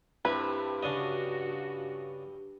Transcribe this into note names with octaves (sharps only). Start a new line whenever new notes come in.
G2 C4 E4 B4
C#3 D4 F#4 D#5